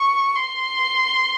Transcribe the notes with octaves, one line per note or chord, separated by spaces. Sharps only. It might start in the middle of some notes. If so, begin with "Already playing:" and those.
Already playing: C#6
C6